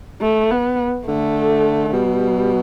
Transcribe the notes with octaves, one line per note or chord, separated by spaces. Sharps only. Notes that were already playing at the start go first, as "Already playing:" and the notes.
A3
B3
D3 A3
D3
B2 G3